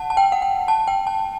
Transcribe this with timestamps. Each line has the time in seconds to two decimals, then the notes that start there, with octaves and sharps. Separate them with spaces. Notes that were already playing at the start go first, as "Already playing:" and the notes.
Already playing: F#5 A5
0.10 A5
0.17 G5
0.32 F#5
0.42 G5
0.68 A5
0.88 G5
1.07 A5